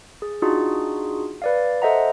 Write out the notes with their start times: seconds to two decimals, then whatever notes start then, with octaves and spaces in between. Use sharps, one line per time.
0.22 G#4
0.42 D4 D#4 F4 F#4 G#4
1.42 B4 D5 F5
1.82 A4 C5 D#5 E5 F#5 A#5